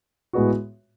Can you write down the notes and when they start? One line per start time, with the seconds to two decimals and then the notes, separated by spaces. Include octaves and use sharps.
0.33 A2 G#3 B3 F#4